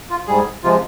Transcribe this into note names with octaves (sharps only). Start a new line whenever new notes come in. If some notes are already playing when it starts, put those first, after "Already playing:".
F4
G#2 G3 G#4
C3 F3 G#3 F4